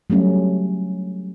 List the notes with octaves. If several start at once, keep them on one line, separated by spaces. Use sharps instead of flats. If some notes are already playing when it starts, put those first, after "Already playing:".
F#3 G3 A3 C#4